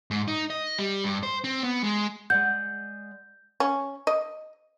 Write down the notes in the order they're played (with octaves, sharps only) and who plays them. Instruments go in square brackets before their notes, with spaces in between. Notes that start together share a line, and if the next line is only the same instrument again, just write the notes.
[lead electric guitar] G#2
D#4
D#5
G3
G2
C5
C4
B3
G#3
[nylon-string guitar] G#3 D5 F#5 [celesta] G6
[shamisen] C#4
D#5